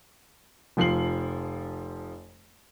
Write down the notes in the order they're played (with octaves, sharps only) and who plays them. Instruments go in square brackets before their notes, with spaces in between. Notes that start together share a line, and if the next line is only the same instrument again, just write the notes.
[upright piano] F1 F3 C7 F#7